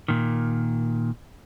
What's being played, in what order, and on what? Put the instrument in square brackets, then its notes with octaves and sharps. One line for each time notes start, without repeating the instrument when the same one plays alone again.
[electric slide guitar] A#2 D#3